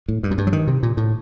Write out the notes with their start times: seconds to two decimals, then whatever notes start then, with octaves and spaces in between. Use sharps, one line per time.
0.08 A2
0.23 G2
0.31 F#2
0.38 G2
0.47 F#3
0.53 D#3
0.67 C3
0.83 A#2
0.97 A2